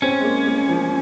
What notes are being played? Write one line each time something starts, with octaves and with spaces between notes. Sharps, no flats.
C4 C#4
G#3
A#3
A#3
F3